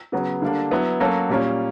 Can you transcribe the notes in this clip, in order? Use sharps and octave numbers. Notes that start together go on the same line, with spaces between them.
C#3 F#3 B3
D3 G3 A#3 D4
F#3 B3 E4
F#3 A#3 C#4 F#4 A4
A#2 G3 A#3 C#4 F4